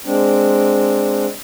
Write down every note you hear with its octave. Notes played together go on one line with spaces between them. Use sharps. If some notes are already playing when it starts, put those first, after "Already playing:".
G#3 C4 D4